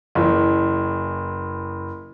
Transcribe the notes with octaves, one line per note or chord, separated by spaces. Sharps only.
F#1 E3